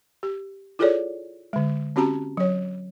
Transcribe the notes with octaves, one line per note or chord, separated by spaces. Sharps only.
G4
E4 F4 G#4 A4 C#5 D5
D3 G#3
C4 C#4 F#4 G4 A5 A#5
F#3 C#5